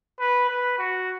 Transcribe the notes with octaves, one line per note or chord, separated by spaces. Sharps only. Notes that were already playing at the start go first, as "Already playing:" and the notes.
B4
B4
F#4